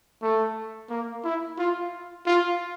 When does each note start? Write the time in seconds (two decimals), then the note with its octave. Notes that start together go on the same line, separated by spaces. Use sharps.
0.22 A3
0.89 A#3
1.24 E4
1.58 F4
2.26 F4